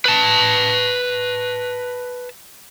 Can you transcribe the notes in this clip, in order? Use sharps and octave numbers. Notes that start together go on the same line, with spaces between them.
B4 A5